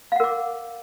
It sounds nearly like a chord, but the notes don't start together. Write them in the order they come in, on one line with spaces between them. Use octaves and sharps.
F5 F#5 A#4 D6